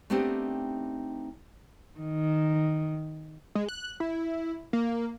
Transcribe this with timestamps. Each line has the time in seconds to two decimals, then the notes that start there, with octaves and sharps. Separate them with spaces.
0.10 A3 B3 C4 D4 D#4 G4
2.00 D#3
3.55 G#3
3.69 F#6
4.00 E4
4.73 A#3